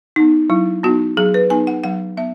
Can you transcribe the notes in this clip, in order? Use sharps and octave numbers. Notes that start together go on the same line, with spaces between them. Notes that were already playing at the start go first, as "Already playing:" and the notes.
B3 D#4
F#3 E4
B3 D#4 F#4
F#3 G#4
B4
B3 D#4 G#5
F#5
F#3 F#5
B3 E5